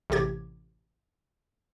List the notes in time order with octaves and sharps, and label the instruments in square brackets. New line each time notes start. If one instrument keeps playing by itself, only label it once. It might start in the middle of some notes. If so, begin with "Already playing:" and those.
[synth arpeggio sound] A1 C3 G4 G#6